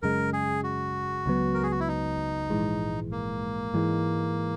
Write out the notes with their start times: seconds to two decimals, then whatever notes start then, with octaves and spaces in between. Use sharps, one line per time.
0.02 F#2 C#3 G#3 A#4
0.33 G#4
0.64 F#4
1.26 C#2 C#3 F#3 B3
1.54 A#4
1.63 G#4
1.71 F#4
1.80 E4
1.88 D#4
2.50 A#1 G#2 E3 G#3
3.11 A#3
3.74 G#2 E3 G#3